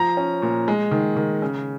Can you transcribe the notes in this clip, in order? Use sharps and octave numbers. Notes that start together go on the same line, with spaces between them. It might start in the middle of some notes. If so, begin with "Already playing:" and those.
Already playing: F3 A#5 A#6
C#4
A#2
G#3
D#3
D#3
C#3